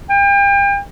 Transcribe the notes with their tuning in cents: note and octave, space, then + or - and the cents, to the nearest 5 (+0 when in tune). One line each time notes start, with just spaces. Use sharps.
G5 +35